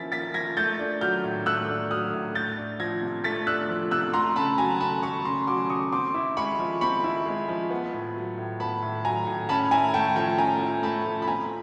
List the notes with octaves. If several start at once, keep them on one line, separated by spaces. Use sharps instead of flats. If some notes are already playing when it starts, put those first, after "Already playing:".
Already playing: F3 A#3 C#4 E4 A6 B6
A#3 A6 B6
F3 G#6 A#6
A3 G6 A6
D4
F#3 F6 G6
A2
A3 E6 F#6
D4
F#3 D#6 F6
A2
A3 G6 A6
D4
F3 G#6 A#6
C3
A3 A6 B6
D4 E6 F#6
F3
C3 E6 F#6
A3 A#5 C6
C#3 A5 B5
F#3 G#5 A#5
C#3 A5 B5
A3 B5 C#6
C#3 A#5 C6
F#3 C6 D6
C#3 C#6 D#6
C4 C6 D6
E4
G#3 B5 C#6
F3
C4 B5 C#6
E4
G#3
F3
B3
A2
F#3
A2
B3 A5 B5
A2
F#3 G#5 A#5
A2
C#4 A5 B5
E4 G#5 A#5
A3 G5 A5
F3 G5 A5
C#4 G#5 A#5
E4
A3 A5 B5
F3
B5
C4 G#5 A#5